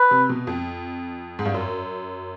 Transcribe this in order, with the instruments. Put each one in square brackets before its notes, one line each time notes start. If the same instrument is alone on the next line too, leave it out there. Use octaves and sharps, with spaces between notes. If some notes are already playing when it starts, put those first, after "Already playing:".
Already playing: [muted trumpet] B4
[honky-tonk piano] C3
B2
F2
G#2
G2
F#2